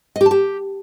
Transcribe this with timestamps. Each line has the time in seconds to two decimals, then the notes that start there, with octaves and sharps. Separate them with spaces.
0.16 D#5
0.21 G4
0.26 A5
0.31 G4